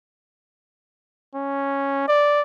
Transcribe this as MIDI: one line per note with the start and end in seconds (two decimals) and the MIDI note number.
1.35 2.04 61
2.08 2.42 74